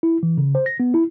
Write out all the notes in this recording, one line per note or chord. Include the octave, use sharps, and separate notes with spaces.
E4
E3
C#3
C5
A#6
B3
E4